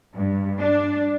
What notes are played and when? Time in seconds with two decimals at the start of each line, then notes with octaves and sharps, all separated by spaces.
0.15 G2
0.60 D4